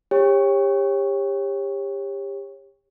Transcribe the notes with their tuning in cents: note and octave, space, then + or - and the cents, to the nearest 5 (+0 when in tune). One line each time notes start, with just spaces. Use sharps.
G4 +25 C#5 -20